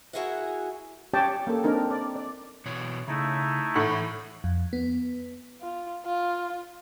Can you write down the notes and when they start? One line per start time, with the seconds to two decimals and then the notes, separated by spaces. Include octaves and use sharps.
0.13 E4 F#4 G#4 A#4 E5 F#5
1.13 C#4 G4 C#5 D5 G5 A5
1.47 A#3 C#4 A4
1.64 C4 D4 D#4 A#4
1.91 D5
2.16 D5
2.66 B2 E3 C#5
3.08 C#3 A3 D#4 E4
3.76 A2 E3 F#5
4.44 F2
4.73 B3
5.61 F4
6.06 F4